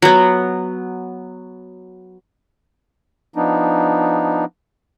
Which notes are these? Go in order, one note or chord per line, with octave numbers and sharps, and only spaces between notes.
F#3 B3
F3 B3 D4 D#4